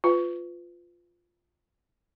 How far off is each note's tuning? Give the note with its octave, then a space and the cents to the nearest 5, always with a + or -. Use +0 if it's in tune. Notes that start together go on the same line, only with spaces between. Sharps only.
F4 +0 B4 +25